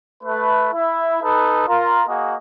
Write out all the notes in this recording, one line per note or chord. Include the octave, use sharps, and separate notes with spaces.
A3 B4
E4 E5
D#4 A4 B4
F4 A#4
A#3 F#4 G#4 D#5